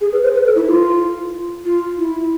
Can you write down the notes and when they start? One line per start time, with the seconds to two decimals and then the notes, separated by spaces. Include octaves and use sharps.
0.01 G#4
0.13 B4
0.23 C5
0.35 B4
0.45 A4
0.55 E4
0.67 F4
1.65 F4
1.98 E4